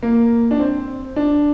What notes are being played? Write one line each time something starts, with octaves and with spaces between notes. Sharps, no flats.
A#3
D4
C4
D4